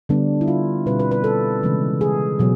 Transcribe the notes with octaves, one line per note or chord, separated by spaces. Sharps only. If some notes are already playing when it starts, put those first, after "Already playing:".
D3 G3 B3 D4
E4
F4
B2 G3 C4 B4
B4
B4
A4
C#3 E3 G#3 C#4
G#4
B2 F#3